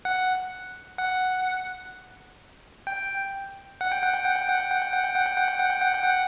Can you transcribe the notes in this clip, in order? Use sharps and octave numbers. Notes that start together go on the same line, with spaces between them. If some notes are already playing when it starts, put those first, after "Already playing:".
F#5
F#5
G5
F#5
G5
F#5
G5
F#5
G5
F#5
G5
F#5
G5
F#5
G5
F#5
G5
F#5
G5
F#5
G5
F#5
G5
F#5